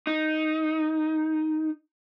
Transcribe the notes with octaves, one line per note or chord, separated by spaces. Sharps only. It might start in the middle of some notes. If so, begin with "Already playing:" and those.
D#4